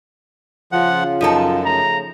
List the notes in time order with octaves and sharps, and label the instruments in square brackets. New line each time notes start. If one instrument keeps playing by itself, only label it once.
[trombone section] C#3 F4 [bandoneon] F3 F#5
[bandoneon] F#2 [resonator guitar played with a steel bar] F3 D#4 A4
[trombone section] C#3 A3 [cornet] A#5